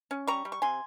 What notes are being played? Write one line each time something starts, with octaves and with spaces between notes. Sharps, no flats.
C#4
G3 A#5 C#6
G3
C#6
C3 G#5 C6